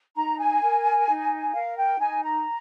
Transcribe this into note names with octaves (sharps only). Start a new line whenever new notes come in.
D#4 A#5
G#5
A#4
D#4
A#4 F5
G5
D#4 G#5
A#5